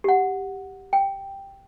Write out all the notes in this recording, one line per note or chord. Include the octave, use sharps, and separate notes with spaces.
G4 F#5
G5